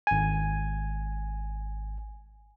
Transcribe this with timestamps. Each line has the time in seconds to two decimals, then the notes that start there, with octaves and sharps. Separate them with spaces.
0.07 G#1 G#5